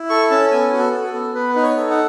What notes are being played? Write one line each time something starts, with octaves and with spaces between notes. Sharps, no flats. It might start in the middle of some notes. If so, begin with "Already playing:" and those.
Already playing: E4
A4 C#6
C#4 A5
B3 G#5
F#4
A4
A4
A4
B3
B3 B4
D#4 B4
C#5
A4
F#5